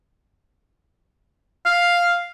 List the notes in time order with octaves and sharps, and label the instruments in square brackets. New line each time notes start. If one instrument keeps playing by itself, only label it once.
[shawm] F5